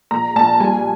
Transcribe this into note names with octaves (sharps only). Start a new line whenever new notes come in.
A#1 A#5
A#1 A5
G3 G#5